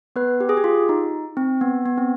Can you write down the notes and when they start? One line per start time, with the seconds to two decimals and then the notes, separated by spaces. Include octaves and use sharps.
0.16 B3 B4
0.40 G4
0.49 G#4
0.57 G4
0.64 F4
0.89 D#4
1.37 C4
1.61 B3
1.86 B3
1.98 C4